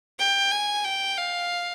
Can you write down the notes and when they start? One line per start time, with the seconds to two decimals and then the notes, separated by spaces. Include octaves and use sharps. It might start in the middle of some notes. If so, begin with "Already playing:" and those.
0.20 G5
0.52 G#5
0.84 G5
1.18 F5